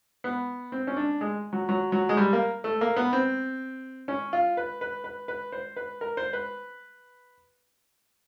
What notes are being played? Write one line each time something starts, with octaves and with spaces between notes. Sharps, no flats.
B3
C4
C#4
D4
G#3
F#3
F#3
F#3
G#3
G3
A#3
A3
A#3
B3
C4
C#4
F4
B4
B4
B4
B4
C5
B4
A#4
C5
B4